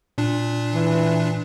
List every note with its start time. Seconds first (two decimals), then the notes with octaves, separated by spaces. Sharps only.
0.18 A#2 D4
0.73 E3